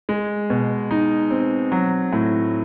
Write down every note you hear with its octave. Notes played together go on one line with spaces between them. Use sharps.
G#3
B2
D#4
C4
F#3
A2